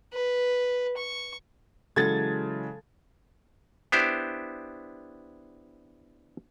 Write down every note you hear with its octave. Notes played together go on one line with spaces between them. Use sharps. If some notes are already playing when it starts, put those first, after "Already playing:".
B4
C#6
C#3 E3 F#3 G#3 A4 G#6 A6
B3 D4 E4 G4 C5